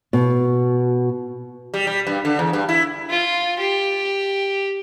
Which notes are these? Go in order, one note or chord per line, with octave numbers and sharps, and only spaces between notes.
B2
G3
G3
G2
D3
E2
G2
E4
F4
G4